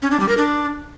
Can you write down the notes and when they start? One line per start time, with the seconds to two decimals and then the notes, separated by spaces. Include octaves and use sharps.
0.02 C#4
0.11 D4
0.20 G3
0.29 A#4
0.37 D4